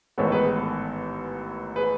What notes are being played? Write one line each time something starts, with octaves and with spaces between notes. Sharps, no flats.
A1 G#2 D#3 G#3 B3 A4 C#5
G#4 B4
G#4
A4
G#4 B4